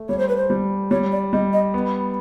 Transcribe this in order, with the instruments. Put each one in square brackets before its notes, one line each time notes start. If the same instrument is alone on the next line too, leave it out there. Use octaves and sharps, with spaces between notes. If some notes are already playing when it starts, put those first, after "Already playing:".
Already playing: [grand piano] A3
[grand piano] G3 [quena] C#5
[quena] C5
B4
C5
[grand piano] G3
[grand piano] G3 [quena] C#5
[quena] D5
[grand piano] G3 [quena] D#5
[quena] D#5
[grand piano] B3